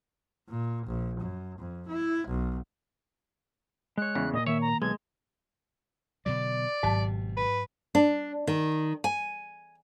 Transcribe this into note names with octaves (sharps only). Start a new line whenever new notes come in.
A#2
A#1
F#2
F2
E4
B1
G#3 C#5 F#6
E2 C#3
A#2 D#5
D#3 A#3 C#5 E5
A#5
B1 G#3 G#6
B2 D3 F#3 D5
G#1 G#2 B2 F#3 A5
B4
D4
D#3
G#5